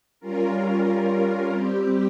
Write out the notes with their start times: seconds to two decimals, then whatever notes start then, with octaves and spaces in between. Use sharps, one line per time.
0.20 G3 C#4 F4 A#4
1.49 G3 C4 G4